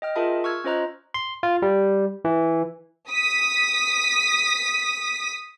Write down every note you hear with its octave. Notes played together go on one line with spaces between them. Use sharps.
D#5 G5 F6
F4 G#4 A#4 E5 A5 B5
C#6 E6 F6 G#6
C#4 F4 C5 D#5 A#5 F#6
C6
F4
G3
E3
D#6 B6